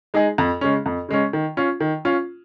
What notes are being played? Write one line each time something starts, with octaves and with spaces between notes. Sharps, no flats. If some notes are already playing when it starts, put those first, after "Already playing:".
G#3 D#4 G#4
F2
C#3 G#3 C#4
F2
C#3 G#3 C#4
D#3
C#4 F4
D#3
C#4 F4